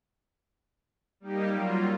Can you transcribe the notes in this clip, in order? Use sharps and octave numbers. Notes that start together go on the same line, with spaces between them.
G3 A#3 D#4 G4
F#3 G3 A#3 F4